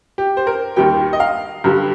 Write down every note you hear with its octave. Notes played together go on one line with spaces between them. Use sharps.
G4
C5
A#4
D#2 D#3 G3 G5
D#5
F5
G2 D3 G3